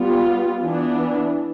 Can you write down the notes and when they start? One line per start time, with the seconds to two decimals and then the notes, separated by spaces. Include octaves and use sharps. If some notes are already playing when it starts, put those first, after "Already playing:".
Already playing: G3 B3 F4
0.61 E3 B3 D4